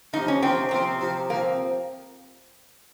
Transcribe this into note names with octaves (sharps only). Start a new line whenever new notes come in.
C3 F3 A#3 D#4 F4
C#4
C3 F3 A#3 C4 F4
C3 F3 A#3 C4 F4
C3 F3 A#3 F4
F3 A#3 C4